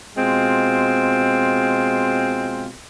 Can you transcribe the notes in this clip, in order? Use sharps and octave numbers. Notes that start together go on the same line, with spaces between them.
B2 G#3 C4 F4